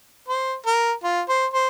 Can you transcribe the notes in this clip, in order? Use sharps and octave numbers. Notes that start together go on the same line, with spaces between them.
C5
A#4
F4
C5
C5